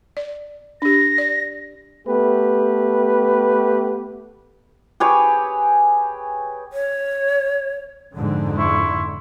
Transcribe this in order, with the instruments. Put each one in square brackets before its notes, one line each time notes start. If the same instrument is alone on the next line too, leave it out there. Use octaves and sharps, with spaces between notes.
[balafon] D5
[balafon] D4 G4 [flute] A#6
[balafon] D5
[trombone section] A3 B3 G4 B4
[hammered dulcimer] G4 G#4 B4 C#5
[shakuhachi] C#5
[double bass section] F2 G#2 D3
[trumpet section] E4 C6 C#6